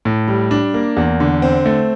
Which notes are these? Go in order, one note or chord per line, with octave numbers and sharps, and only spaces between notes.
A2
G3
D4
A#3
E2
D3
C4
A3